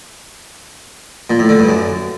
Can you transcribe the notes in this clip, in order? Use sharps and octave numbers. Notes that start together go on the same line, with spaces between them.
A#2
A2
D3
G2
F#2